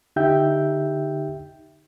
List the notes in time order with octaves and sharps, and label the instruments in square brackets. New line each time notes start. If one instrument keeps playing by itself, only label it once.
[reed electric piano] D3 D#4 G4 E5 G5 G6